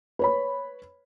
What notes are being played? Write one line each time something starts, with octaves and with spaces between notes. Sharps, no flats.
B4 C#5 B5